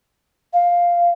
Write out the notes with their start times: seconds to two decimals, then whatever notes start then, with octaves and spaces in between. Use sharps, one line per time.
0.53 F5